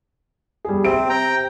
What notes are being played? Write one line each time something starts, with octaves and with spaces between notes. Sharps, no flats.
G3 G#4
C3 C4 D7
G5 A#5